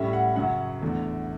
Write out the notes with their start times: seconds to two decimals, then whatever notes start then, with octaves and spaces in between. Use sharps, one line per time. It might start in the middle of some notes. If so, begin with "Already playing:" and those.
Already playing: A2 G3 C#4 E5
0.13 F#5
0.36 F#2 C#3 F#3 C#4 F#5
0.81 E2 D3 A3